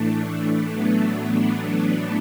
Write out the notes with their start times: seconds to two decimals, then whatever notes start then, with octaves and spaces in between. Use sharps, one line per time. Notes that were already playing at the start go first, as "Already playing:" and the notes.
Already playing: A2 E3 A3 D4
0.73 F#3 B3
1.37 A3 D4